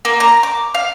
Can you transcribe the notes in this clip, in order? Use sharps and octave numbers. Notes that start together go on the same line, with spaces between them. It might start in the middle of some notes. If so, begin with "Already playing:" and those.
A#3
A#5
D6
F5